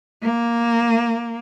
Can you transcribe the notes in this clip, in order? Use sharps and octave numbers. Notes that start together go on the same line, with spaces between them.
A#3